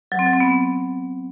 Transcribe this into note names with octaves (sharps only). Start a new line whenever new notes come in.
F#3
C4
F#3
C4
B3